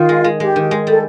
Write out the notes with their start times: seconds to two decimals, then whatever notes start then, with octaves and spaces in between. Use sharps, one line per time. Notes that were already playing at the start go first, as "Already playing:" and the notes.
Already playing: D#3 F4
0.09 G#3
0.24 G#3
0.39 G#3 G4
0.56 D#3
0.71 G#3
0.87 G3 A4